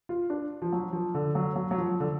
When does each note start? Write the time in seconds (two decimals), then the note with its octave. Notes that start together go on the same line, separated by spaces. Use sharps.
0.09 F4
0.30 D4
0.62 F3
0.72 F#3
0.93 F3
1.14 D3
1.35 F#3
1.56 F#3
1.71 F#3
1.78 F3
2.00 D3